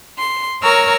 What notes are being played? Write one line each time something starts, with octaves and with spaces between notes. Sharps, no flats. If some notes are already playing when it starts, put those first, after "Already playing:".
C6
A#4 C#5 A#5 C#6 E6 F6